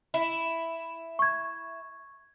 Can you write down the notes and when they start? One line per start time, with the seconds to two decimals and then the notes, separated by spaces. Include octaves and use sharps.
0.14 E4
1.19 C#6 G#6